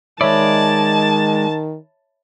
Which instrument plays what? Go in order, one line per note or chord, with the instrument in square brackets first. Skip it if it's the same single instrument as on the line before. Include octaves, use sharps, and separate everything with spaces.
[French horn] D#3 [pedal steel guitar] G#3 D5 [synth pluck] C#5 E5 B5 [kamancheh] A5